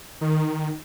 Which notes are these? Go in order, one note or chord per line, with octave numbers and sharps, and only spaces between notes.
D#3